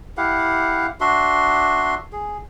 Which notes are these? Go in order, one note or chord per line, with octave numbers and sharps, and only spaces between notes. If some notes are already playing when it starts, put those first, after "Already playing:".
E4 G4 F5 F#5
D4 F#4 E5 C6
G#4